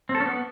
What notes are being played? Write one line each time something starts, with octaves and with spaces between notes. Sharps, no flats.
C4
A4
C#4
B3